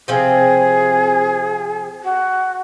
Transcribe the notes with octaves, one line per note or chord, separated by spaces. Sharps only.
C3 F3 C4 G#4
F#4